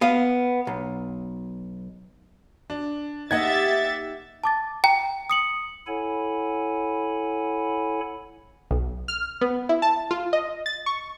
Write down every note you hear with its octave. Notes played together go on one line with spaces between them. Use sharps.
B3 F5
B1
D4
A#3 D#4 G4 D#5 E5 F#5 G#6 A6
A5 D6 A6
G5 A#5
D#6 C#7 F#7
E4 A4 C#5 F#5 G#5 B5
B1
F6
B3
E4
A5
F4
D#5
A6
C#6